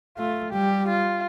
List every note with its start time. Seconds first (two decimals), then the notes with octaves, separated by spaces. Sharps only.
0.18 A3 F4
0.52 G3 G4
0.88 F4